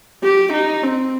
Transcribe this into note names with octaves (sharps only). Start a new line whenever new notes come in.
G4
D#4
C4